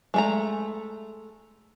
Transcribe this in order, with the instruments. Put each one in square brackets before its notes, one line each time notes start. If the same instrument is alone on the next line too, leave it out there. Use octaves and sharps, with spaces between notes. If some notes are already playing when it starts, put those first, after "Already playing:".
[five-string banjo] G#3 A3 A#5